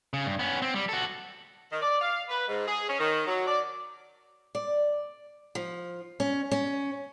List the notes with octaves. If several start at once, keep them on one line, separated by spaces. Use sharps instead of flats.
C#3
G2
B3 C#4
C4
G3
F#4 A4
D#3
D5
F5
B4
G#2
G#4
C#4
D#3
F#3
D5
D5
F3
C#4
C#4